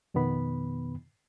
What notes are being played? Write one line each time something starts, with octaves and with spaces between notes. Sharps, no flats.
F2 B2 D#3 B3 B5